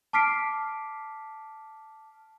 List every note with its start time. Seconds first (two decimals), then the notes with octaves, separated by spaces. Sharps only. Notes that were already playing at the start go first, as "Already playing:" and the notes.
0.13 A5 D6 F6 B6 C7 D7